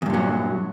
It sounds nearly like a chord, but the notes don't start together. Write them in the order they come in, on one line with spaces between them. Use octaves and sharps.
E2 G2 A#2 F#3